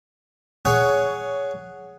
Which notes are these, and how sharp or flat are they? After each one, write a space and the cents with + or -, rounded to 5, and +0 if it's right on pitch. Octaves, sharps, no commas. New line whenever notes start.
G#4 +0 C#5 +15 F#5 +0